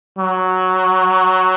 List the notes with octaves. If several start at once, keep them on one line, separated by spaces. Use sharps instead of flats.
F#3